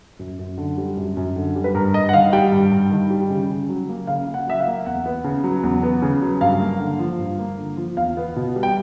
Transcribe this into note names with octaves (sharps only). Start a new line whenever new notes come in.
F#2
F#2
D3
G3
F#2
F#2
D3
G3
B4
G2 A#4
G2 D#5
F#5
D#3 F5
G3 G5
G2
G2
D#3
G3
C#3
C#3
F#3
A#3
C#3 F5
C#3
F#5
F#3 E5
F5
A#3
E2 F#5
B3
C#3
F#3
E2
B3
C#3
F#3
G2 F5
A#3
D3
F3
G2
A#3
D3
F3
E2 F5
B3
B2
G3
G5